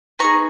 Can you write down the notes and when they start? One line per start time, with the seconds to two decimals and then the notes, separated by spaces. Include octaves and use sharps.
0.19 B3 D#4 G#4 A#5 C#6